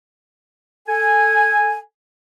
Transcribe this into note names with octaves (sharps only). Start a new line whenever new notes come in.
A4 G#5